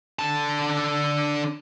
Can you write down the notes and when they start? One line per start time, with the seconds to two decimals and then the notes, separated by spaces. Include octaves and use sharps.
0.19 D3 A5